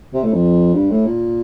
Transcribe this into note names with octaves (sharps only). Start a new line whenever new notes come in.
C3
A2
F2
G2
A2
A#2